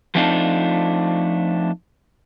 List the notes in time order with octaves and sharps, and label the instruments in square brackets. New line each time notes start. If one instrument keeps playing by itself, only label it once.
[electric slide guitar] F3 A3 C4 D4 D#4 F4